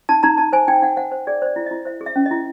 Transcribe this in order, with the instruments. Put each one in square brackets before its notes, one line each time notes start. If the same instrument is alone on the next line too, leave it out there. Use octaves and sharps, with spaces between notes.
[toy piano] D#4 A5
D#4 A#5
D#4 A5
C5 G#5
D#4 G5
D#4 F#5
C5 F#5
C5
G#4 D5
C5 D5
E4
E4 D#5
C5 E5
G#4
E5
C#4
D#5
E4